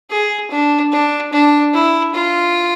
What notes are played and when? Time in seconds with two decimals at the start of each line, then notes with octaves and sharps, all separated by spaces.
0.11 G#4
0.51 D4
0.92 D4
1.33 D4
1.74 E4
2.15 F4